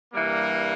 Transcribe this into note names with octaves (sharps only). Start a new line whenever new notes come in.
G2 E3 G3 A#3